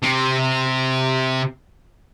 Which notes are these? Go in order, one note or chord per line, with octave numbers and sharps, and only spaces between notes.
C3 C4